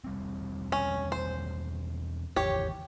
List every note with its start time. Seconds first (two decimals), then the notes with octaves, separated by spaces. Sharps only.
0.04 E1 G3 C4
0.72 C#4
1.12 C5
2.36 G#1 E2 G4 C#5